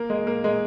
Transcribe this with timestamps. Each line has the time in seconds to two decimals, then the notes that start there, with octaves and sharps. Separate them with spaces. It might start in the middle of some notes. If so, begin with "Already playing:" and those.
Already playing: A#3
0.10 G#3
0.27 A#3
0.44 G#3